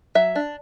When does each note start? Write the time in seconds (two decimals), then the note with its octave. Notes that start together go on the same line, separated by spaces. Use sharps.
0.15 F#3 E5
0.35 D4